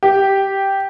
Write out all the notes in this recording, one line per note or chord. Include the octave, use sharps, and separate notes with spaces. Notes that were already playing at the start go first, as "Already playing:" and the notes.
G4